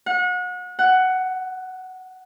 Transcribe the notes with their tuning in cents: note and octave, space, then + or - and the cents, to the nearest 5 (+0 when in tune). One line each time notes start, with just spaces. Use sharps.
F#5 -35
F#5 +10